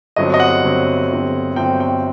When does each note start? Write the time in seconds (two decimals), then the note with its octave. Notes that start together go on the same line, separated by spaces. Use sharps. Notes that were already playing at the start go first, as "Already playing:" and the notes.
0.16 G1 G2 D3 F#3 C4 D#5
0.34 D#5
0.40 F#5
0.64 G1 G2 D3 F#3 C4
1.10 G1 G2 D3 F#3 C4
1.56 G1 G2 D3 F#3 C4 G5
1.80 G5